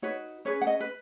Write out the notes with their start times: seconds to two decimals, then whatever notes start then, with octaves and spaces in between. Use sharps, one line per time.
0.02 D#4 F#4 B4 C#5
0.45 C#4 G#4 B4 C#5
0.62 F#5
0.67 D#5
0.80 B4